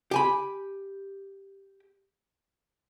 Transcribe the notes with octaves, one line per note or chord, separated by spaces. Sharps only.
G4 G#5 B5